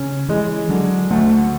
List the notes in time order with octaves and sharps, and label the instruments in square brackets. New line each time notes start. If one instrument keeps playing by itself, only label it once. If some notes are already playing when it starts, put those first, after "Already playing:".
Already playing: [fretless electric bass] C#3 [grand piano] C#4
[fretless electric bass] E3 [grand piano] G#3
[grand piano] D3 [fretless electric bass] F#3
[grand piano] D2 [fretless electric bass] A3